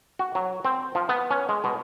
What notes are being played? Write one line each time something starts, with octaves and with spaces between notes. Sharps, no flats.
F#4
F#3
C4
F3
B3
C#4
G#3
B2